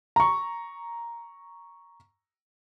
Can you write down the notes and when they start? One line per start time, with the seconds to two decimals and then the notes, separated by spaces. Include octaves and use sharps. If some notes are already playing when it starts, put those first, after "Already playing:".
0.16 A#5 C#6